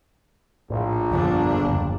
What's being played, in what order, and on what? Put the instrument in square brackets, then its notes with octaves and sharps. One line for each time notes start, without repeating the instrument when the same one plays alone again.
[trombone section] A#1 [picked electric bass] A2
[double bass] G1 D4 [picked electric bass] F2 D3 F3
[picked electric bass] F#1 D#2